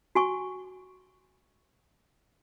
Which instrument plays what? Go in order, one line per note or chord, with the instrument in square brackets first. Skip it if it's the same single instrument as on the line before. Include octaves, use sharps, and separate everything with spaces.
[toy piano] F#4 G#5 C#6